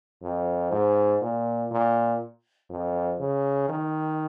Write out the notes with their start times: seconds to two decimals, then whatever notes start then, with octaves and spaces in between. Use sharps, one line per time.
0.22 F2
0.71 G#2
1.22 A#2
1.71 A#2
2.70 F2
3.20 C#3
3.69 D#3